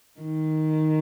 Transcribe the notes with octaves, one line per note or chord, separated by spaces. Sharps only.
D#3